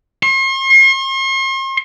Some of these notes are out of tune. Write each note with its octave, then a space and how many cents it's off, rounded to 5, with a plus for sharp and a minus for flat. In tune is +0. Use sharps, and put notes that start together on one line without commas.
C6 +45